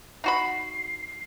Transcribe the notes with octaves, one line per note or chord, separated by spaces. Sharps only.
D#4 F#4 B5 C7